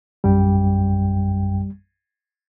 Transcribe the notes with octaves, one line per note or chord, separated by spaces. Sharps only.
A#1 F#2 G3 G5